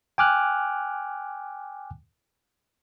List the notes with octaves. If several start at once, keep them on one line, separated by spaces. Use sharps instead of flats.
G5 G#5 D6 F6 F#6